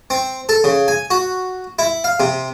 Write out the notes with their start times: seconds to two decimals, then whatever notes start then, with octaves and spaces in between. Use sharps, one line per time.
0.10 C4
0.49 A4
0.64 C#3
0.88 G#5
1.10 F#4
1.79 E4
2.04 F5
2.20 C3